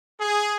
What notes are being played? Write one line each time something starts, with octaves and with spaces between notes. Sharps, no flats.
G#4